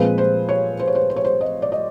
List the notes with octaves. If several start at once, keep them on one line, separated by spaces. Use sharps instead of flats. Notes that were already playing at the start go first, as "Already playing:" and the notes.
Already playing: A#2 F3 G#3 C4 B4
C5
C#5
C5
C#5
C5
C5
C#5
C5
D#5
D5
D#5